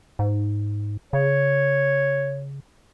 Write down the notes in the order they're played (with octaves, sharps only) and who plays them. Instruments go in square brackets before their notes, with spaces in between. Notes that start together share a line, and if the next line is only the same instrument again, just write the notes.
[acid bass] G#2
[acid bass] C#3 [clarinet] C#5